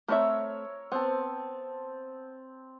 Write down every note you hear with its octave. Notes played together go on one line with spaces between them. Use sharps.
A3 C4 A#4 C#5 E5 E6
B3 C4 A5